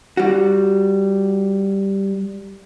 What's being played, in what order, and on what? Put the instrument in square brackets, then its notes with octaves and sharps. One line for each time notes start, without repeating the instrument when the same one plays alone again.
[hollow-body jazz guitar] G3 F#4